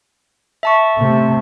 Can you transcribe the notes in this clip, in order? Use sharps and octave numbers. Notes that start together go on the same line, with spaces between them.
E5 A5 C#6
C3 A3